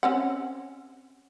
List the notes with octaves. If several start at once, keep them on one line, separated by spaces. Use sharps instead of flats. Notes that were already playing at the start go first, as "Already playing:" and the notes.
C4 C#4 F#5